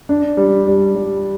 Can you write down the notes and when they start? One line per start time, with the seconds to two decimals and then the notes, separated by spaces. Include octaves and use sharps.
0.09 D4
0.37 G3
0.67 G3
0.96 G3